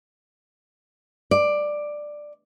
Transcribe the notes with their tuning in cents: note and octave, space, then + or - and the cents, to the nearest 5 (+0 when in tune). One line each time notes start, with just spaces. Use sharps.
D5 +10